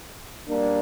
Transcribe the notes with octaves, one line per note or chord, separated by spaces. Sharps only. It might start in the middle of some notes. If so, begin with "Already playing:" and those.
G3 A#3 D4